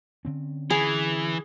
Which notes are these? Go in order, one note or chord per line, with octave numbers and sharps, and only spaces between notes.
D3 C4 C#4
E3 G#4